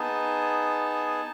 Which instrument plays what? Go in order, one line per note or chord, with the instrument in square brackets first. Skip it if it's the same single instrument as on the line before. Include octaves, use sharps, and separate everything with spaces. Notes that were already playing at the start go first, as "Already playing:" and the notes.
Already playing: [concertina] B3 D#4 G#4 A5